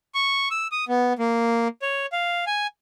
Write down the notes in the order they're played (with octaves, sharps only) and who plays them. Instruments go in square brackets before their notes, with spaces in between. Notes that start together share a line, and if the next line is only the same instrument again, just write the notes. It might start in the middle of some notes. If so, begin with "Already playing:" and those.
[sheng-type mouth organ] C#6
E6
D#6
B3
A#3
C#5
F5
G#5